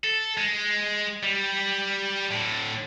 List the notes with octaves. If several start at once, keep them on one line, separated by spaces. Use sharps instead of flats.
A4
G#3
G3
A2 D3